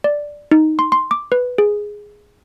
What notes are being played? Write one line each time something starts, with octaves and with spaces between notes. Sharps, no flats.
D5
D#4
C6
C6
D6
B4
G#4